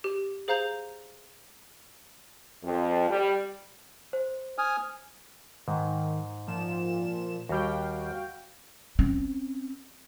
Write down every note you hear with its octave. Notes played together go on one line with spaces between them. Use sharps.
G4
G#4 C5 F5 A#5 G6 F7
F2
G3
C5
G#5 D#6 F6
G#2 D#3
A#2 F3 E7
D#2 G3 F#4 F5 G5
C4 C#4